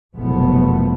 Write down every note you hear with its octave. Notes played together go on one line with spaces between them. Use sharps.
F#1 C2 B2 F3 A3 B3